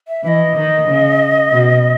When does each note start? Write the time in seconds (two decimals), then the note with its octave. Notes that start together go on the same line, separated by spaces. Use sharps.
0.08 E5
0.24 E3 E5
0.28 D#5
0.56 D#3
0.88 C#3
1.52 B2